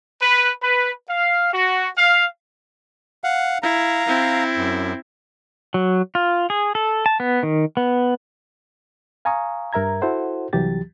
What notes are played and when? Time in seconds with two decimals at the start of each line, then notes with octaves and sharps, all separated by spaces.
0.22 B4
0.63 B4
1.10 F5
1.54 F#4
1.98 F5
3.24 F5 F#5
3.63 E4 F5 A#5
4.07 C4 E4
4.56 F#2
5.74 F#3
6.15 F4
6.50 G#4
6.75 A4
7.06 A5
7.20 B3
7.43 D#3
7.77 B3
9.25 F5 G#5 A#5 C#6 D#6
9.73 G2 A#4 E5 A#5 G#6
10.02 E4 F#4 A4 C5 F#5
10.53 C2 E3 F#3 G4 A6